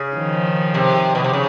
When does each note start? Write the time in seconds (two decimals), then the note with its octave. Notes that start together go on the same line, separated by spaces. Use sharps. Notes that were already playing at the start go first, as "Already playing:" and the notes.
Already playing: C#3
0.16 D#3 F3
0.74 C3
1.15 B2
1.24 C3
1.33 C#3